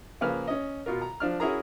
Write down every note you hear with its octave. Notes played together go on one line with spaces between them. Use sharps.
C#3 F3 A#3 B4 F6
C#4 D#5
B2 F4 A#4
A#5
F3 D4 F6
C#4 E4 F#4 G#4 A#4 A#5